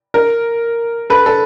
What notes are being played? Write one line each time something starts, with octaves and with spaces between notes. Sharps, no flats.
A#4
A4 B4
A4